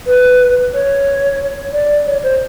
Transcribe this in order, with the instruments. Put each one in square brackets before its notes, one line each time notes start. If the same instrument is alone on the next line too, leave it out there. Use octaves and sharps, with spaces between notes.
[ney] B4
C#5
D5
C#5
C5